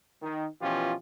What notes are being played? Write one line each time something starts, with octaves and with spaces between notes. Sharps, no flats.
D#3
B2 E3 F3 C#4 F4 G4